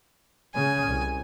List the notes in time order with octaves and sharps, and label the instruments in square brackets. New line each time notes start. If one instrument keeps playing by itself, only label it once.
[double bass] C#3 [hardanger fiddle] G#5
[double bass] C2